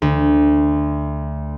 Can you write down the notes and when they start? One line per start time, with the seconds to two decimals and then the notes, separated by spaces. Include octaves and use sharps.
0.02 D2